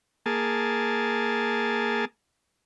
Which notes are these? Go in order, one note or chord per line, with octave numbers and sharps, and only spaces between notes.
A#3 G#4 A5